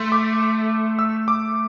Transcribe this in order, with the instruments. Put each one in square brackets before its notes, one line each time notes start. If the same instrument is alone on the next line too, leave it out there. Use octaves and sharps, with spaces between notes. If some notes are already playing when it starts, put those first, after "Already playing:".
Already playing: [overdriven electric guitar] A3 [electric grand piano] C6
[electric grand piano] D6
E6
D6